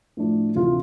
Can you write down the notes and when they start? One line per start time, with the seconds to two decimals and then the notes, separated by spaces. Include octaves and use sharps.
0.17 A2 F3 A3 D4
0.56 D2 C3 E3 F4